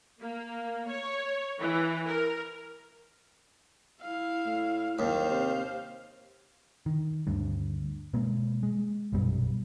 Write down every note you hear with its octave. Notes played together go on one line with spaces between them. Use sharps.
A#3
C#5
E3
A#4
E4 F5
A2
F#1 D#2 C5 F5
C3
D#3
D2 G2
B2 G#3 A#3
G#3
A#1 F#2 B2 G3